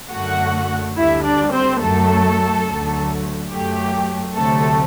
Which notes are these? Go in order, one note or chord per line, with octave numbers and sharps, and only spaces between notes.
F#2 D3 A3 F#4 F#5
D2 D3 G3 E4 E5
D4 D5
C4 C5
F#2 F#3 A3 A4
D2 D3 F#3 A3
F#2 F#3 A3 G4
D2 C3 F#3 A3 A4